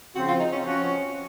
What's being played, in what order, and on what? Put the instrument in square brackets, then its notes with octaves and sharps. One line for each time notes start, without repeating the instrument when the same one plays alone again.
[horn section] C#3 F3 C4 [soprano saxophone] F#4
[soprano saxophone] F4
D#4
C#4
[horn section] F3 C4 F#4 [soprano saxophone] C#4